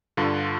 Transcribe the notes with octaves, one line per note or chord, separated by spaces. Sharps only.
G2 D3 F4